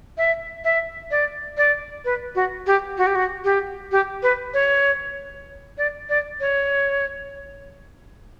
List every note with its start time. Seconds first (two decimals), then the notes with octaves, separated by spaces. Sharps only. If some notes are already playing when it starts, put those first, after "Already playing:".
0.18 E5
0.64 E5
1.11 D5
1.57 D5
2.05 B4
2.35 F#4
2.67 G4
2.98 F#4
3.07 G4
3.15 F#4
3.44 G4
3.92 G4
4.23 B4
4.54 C#5
5.78 D5
6.09 D5
6.40 C#5